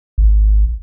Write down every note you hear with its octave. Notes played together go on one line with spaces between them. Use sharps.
G#1